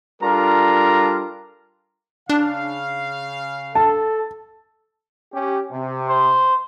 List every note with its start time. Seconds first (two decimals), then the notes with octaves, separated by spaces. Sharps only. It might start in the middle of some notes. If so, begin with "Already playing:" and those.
0.22 G3 D4 F4 A4 A#4 A#5
2.29 C#3 D4 F5
3.75 A4 A5
5.34 C#4 G4
5.72 C3
6.09 C5